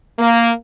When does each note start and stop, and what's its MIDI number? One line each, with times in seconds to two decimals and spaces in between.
0.18 0.50 58